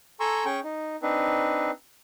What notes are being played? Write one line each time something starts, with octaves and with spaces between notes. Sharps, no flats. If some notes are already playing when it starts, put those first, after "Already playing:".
A4 G#5 A#5 C6 C#6 E6
C#4 G#4 G5 C#6
D#4
C4 D4 D#4 B4